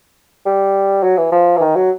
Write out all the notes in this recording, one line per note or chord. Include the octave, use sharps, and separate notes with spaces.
G3
F#3
E3
F3
E3
D#3
F#3